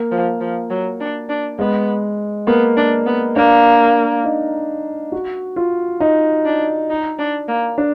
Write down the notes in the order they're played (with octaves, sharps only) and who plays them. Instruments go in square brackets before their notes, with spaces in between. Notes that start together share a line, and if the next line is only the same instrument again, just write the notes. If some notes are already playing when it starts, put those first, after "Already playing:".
Already playing: [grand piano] A#3
[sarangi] F3
F3
F#3
D4
D4
[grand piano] G#3 [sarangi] B3
[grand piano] A#3 [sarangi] B3
[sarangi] D4
B3
[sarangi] A#3 [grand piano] D4
[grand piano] D#4
F#4
F4
D#4
[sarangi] D4
D#4
D4
A#3
[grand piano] D4